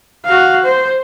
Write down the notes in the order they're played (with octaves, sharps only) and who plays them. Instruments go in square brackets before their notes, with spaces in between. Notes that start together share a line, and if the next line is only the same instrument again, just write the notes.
[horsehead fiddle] F#4 F5
C5